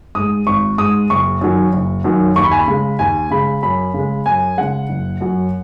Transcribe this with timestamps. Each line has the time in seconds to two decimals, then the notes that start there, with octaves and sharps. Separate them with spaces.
0.15 G#2 G#3 D#6
0.46 G#1 C#6
0.78 G#2 G#3 D#6
1.10 F#1 C#6
1.41 F#2 D#3 F#3
1.73 F#1
2.04 F#2 D#3 F#3
2.36 D#2 C#6
2.44 B5
2.51 G#5
2.59 B5
2.68 C#3 G#3
2.99 D#2 G#5
3.31 C#3 G#3 B5
3.63 F#2 B5
3.94 C#3 G#3
4.26 F#2 G#5
4.57 C#3 G#3 F#5
4.89 F#1
5.21 F#2 F#3